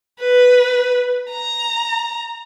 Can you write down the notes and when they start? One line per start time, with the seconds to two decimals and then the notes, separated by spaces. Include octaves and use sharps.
0.20 B4
1.31 A#5